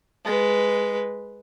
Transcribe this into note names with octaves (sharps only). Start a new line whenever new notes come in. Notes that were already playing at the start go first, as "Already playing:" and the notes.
G#3 B4